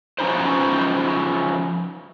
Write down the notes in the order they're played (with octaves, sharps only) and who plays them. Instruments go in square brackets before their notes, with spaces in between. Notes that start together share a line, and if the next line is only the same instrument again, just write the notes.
[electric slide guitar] F3 F#3 C#4 D#4 B4 C5